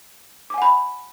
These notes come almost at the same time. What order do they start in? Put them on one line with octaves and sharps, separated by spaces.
D6 G#5 F#5 B5